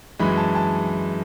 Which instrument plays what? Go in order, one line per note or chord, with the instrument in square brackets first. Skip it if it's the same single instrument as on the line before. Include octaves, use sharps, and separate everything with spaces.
[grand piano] F#2 E3 G#3 B5
A5
A5